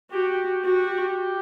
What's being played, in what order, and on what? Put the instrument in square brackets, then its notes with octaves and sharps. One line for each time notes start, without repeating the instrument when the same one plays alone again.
[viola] F#4 [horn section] G4
[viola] F#4 [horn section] G4